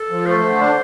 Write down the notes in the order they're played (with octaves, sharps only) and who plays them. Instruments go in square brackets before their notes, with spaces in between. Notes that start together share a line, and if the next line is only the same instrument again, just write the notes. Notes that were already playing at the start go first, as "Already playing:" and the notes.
Already playing: [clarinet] A4
[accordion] F3
[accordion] A3 [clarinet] C5
[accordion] D3
D4